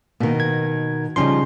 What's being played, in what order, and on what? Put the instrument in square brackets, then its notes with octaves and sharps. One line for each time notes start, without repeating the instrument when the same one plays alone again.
[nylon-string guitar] B2 D#3 [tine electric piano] A#3
[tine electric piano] G#6
[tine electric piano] C#3 C#4 C6 [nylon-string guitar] F3 G3 D#4